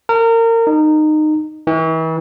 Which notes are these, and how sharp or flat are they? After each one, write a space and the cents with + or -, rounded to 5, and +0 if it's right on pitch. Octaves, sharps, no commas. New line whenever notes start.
A#4 -30
D#4 -20
E3 -40